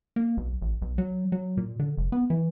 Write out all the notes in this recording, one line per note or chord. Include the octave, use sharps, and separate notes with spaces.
A#3
B1
A1
B1
F#3
F#3
A#2
D3
F1
B3
E3